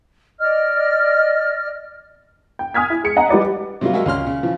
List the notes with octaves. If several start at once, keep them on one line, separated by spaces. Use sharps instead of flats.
D5 D#5 F6
G5
G#5 D#6 F6 G#6 B6
E4
G#3 C#7
D#5 F#5 G#5 A#5
G3 G4 B4 D5 D#5
C3 F#3 G3 A#3 F4
G#3 F#4 A#4 E5 F5
C#2 C#4 C6 F6
C#3
C#3 E3 F3